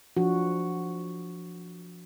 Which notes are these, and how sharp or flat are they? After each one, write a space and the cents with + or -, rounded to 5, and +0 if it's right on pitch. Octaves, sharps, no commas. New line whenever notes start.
F3 +0 D4 -5 F#4 +0